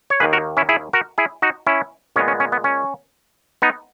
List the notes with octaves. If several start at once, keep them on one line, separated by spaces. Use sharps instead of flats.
C#5
D#2 D#3 A#3 G#4 B4
F#4 A#4
C#4 E4
E4 G#4
F#4 A#4
E4 G#4
D#4 F#4
C#4 E4
A#2 G#3 B3 C#4
C#4
C#4
B3
C#4
B3 D#4